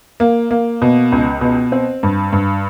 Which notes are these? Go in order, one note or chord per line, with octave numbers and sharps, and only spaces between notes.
A#3
A#3
B2
C#2
B2
C4
G2
G2